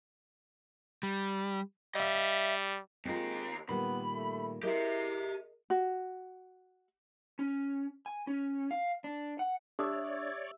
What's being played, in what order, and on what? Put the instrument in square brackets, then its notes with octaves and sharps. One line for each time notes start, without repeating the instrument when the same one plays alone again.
[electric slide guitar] G3
[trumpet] G3 [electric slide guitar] D#5 E5
[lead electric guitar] D#2 A#4 [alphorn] G#3 [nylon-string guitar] C4 F4
[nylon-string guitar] A#2 D#3 G3 [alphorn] B3 [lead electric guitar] B5
[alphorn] A3
[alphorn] E4 [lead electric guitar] G4 E5 [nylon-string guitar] G#4 A#4 D#5
[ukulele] F#4
[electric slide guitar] C#4
G#5
C#4
F5
D4
F#5
[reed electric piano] D4 [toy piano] G4 D#6 [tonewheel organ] C#5 D5 [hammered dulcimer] E5